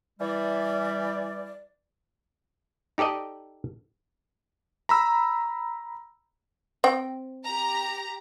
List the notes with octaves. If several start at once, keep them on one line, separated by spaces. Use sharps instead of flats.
E3 G3 D5
D#4 G4 A4 D5 D#5
A#5 B5 E6
C4 G5
G4 A#5